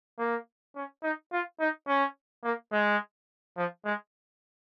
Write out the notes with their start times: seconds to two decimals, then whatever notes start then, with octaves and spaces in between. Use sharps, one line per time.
0.19 A#3
0.76 C#4
1.03 D#4
1.32 F4
1.60 D#4
1.87 C#4
2.44 A#3
2.72 G#3
3.57 F3
3.85 G#3